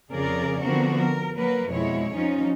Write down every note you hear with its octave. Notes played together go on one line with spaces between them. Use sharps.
F2 C#3 G#4 A#4 D5
D3 F3 B3 C4 F#4 A#4
A#4
F#3 A#3 A#4 B4
F2 B2 G#3 E4 C#5
F3 C#4 D#4